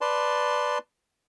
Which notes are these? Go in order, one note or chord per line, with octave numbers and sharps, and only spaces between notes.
B4 D5 A5 C6